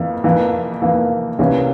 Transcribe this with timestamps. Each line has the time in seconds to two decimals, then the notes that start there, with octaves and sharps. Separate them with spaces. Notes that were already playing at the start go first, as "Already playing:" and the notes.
Already playing: F2 E3 A#3
0.24 F2 E3 A#3
0.82 F2 E3 A#3
1.39 C2 C3 E3 A#3 C#4